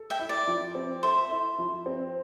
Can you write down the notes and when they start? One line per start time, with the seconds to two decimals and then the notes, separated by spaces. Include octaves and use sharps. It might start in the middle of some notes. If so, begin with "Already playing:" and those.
Already playing: A4
0.10 E5 G5
0.19 E4
0.29 D5
0.47 F3
0.75 C4
1.03 A4 C5 E5
1.31 E4
1.58 F3
1.86 C4